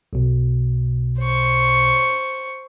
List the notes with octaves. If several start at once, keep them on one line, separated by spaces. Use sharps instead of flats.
B1 B2
C5 C#6